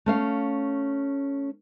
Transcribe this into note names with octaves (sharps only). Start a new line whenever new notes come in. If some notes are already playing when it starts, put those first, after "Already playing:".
A3 C#4 F5